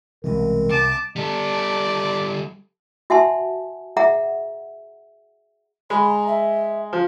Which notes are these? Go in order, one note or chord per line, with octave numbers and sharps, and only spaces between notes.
C2 B2 E3 G#3 C4 A#4
C2 A5 D6
G3 A4 D5
F#4 E5 F#5 G#5 A5 C6
G#4 E5 F#5 A#5
G#3 B5
A#5
E5
F3